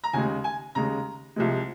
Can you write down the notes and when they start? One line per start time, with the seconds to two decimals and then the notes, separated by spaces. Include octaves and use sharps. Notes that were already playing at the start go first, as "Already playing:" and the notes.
0.04 A#5
0.13 D#2 C#3 G#3 G#5
0.44 G#5
0.75 D#2 C#3 G#3 A#5
1.36 C2 C3 F3 G#3